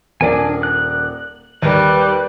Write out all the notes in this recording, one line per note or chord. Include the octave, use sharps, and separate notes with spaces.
D#1 D4 A#4 D5 G#5
F#6
D#2 G3 B4